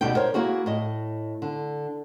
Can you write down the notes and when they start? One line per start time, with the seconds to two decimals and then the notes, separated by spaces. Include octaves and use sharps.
0.01 D2 B2 G3 D#4 G5
0.15 A#4 C5 C#5
0.34 A#3 E4 F#4 G#4
0.66 A2 D#5
1.42 D3